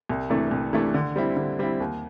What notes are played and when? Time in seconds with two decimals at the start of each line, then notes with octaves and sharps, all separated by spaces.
0.09 C2
0.30 C3 E3 A3 D4
0.51 C2
0.73 C3 E3 A3 D4
0.94 D3
1.16 G3 C4 E4
1.37 D3
1.59 G3 C4 E4
1.80 D#2